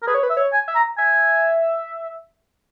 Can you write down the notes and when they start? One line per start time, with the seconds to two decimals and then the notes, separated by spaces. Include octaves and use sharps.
0.02 A#4
0.07 G#4 B4
0.15 C#5
0.23 B4
0.30 E5
0.37 C#5
0.53 G#5
0.68 E5
0.75 A#5
0.98 E5 G#5